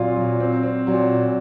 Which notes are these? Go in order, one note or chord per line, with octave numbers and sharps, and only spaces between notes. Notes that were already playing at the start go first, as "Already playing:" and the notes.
Already playing: A#2 F#3 C4 F4
F#3
C4
C4
A#2 F#3